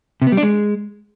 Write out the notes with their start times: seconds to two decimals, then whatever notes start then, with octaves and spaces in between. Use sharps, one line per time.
0.22 C3
0.27 B3
0.32 G3
0.37 D4
0.43 G#3